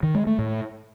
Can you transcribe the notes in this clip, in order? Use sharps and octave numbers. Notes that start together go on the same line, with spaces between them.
D#3
G#3
A3
A2